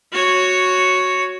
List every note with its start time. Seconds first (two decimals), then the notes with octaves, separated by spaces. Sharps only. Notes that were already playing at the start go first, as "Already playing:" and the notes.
0.12 F#4 C#5